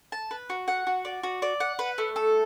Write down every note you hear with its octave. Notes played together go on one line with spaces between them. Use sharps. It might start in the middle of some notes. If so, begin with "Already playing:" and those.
A5
B4
F#4
F#5
F#4
D5
F#4
D5
F#5
B4
A3
A4